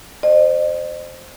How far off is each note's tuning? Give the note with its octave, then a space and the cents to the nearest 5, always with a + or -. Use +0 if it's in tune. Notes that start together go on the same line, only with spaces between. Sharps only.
C5 +0 D#5 -45